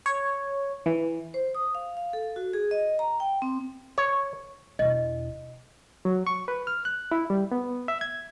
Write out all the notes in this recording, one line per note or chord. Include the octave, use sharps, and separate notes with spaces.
C#5
E3
C5
D#6
F5
F5
A4
F#4
G#4
D#5
A#5
G5
C4
C#5
E1 D#5
F#3
C#6
B4
F6
F#6
E4
G3
B3
E5
G#6